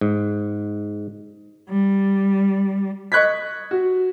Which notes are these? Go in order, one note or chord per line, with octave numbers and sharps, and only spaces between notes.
G#2
G3
D#5 C#6 F#6 G#6 B6
F#4